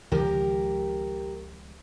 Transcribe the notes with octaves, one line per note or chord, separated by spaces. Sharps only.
C#2 D#3 F3 G4 A#4